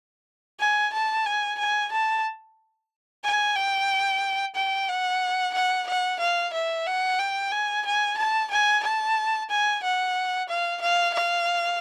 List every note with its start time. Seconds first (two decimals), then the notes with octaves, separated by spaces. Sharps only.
0.60 G#5
0.93 A5
1.26 G#5
1.59 G#5
1.92 A5
3.24 G#5
3.56 G5
4.55 G5
4.89 F#5
5.54 F#5
5.87 F#5
6.20 F5
6.53 E5
6.86 F#5
7.19 G5
7.52 G#5
7.86 G#5
8.18 A5
8.51 G#5
8.84 A5
9.50 G#5
9.83 F#5
10.49 F5
10.81 F5
11.14 F5